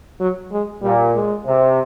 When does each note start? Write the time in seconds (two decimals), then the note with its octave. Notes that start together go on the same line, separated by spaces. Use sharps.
0.20 F#3
0.52 G#3
0.82 A#2 G3
1.14 G#3
1.45 C3